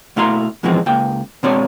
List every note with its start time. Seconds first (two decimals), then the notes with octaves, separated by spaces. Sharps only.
0.16 B2 A3 E4 F5 A#5 C6
0.63 E2 B2 E3 F3 G#3 C4
0.86 C#2 A#3 G5
1.43 B2 G#3 C4 C#5 D5 A5